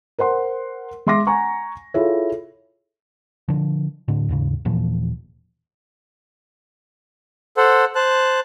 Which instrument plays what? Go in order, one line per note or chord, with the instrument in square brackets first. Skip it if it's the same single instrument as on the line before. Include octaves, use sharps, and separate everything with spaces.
[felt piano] A#4 C5 F#5 C6
G#3 E5 C6 D6 A#6
F#5 G#5 A#5 C#6
E4 F4 G#4 A4 C#5 E5
[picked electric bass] D3 F3
A2 D3
D#2 G#2 C#3
D#1 A#2 E3 F3
[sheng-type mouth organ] A4 C5 F#5
C5 A5 F#6